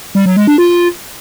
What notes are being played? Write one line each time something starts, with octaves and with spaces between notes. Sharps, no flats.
G3
F#3
G#3
D4
F4